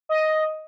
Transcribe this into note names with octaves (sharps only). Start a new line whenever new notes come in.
D#5